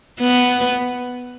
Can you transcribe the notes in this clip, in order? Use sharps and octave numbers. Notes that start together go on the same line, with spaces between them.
B3